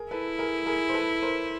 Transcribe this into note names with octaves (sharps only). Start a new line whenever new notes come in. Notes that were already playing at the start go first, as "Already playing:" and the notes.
Already playing: G#4 A#4
E4 A4 B4
G#4 A#4
G#4 A#4
C5
A4 B4
A#4 C5